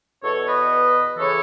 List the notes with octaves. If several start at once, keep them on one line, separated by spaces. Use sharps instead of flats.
E2 B2 A4 C#5
B4 D#5
C#3 E3 A4 C#5